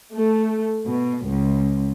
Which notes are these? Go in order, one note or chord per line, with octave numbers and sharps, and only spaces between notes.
A3
B2
C#2